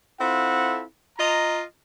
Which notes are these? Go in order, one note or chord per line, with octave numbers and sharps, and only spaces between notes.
C4 E4 F4 A4 F#5
F4 D#5 A#5